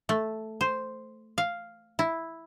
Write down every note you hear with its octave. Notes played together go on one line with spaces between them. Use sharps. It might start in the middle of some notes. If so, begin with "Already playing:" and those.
A3
C5
F5
E4